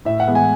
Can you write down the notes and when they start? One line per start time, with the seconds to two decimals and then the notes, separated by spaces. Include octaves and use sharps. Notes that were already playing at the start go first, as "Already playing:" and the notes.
0.05 A2 E5
0.20 F#5
0.27 E3 G#3 B3
0.35 G#5